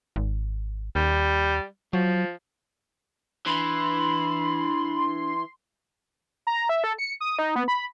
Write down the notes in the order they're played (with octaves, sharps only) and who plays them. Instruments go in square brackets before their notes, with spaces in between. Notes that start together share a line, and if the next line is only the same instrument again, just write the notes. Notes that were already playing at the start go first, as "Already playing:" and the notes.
[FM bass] G#1
[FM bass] D#2 [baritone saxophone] G3
[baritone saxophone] F3 [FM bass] F#3
[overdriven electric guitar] E3 [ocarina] D4 [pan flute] B5 [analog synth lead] C6
[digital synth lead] A#5
E5
A4
C#7
D#6
D#4
B3
B5